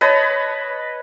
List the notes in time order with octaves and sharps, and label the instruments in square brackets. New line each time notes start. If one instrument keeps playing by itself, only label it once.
[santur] B4 C#5 D#5 A5